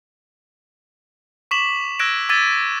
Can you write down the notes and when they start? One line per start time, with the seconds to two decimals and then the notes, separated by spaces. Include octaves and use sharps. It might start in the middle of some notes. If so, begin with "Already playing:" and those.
1.51 C#6 D6 B6 E7 F#7
1.99 E6 F#6 G#6 A#6 D7 E7
2.29 D6 E6 G#6 A6 B6 D#7